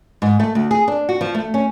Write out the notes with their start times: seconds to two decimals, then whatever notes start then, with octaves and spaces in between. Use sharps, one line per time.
0.22 G#2
0.40 A3
0.55 D2
0.71 G#4
0.88 D4
1.09 F#4
1.21 F3
1.34 A3
1.54 C#4